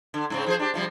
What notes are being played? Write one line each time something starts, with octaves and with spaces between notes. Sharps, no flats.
D3
G#2 C#3 C4
F3 G#4 C5
D4 G4
C3 F3 G3